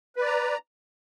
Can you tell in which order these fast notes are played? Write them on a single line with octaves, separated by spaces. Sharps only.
B4 D5 A#5